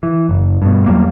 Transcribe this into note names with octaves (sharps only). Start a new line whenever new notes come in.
E3
F#1
G2 B2
E2 F#3 G3 A#3